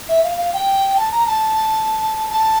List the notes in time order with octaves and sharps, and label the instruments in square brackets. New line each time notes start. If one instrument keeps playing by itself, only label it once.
[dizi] E5
F5
F5
G5
A5
A#5
A5
A5